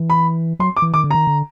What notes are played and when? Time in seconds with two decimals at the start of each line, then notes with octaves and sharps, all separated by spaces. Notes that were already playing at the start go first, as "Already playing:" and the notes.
Already playing: E3
0.10 B5
0.59 F#3 C6
0.77 D6
0.82 E3
0.94 D#3 D6
1.04 D3
1.11 D#3 A#5
1.27 D3